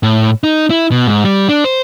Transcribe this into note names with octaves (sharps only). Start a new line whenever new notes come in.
A2
D#4
E4
B2
G#2
G3
D4
C5